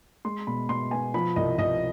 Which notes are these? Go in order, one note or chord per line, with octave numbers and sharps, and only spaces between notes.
G#3 C6
B2 B5
B2 C6
B3 G#5
F3 B5
C2 D#5
C2 D#5